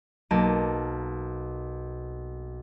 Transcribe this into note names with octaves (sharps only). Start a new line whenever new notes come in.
B1 A#3 A5 D#7